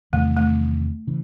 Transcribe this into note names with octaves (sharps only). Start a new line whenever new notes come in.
E2 C3 D#3 G3 A3
A3
C#3 E3